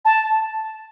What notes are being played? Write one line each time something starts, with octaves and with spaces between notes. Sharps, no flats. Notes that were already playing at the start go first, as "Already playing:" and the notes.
A5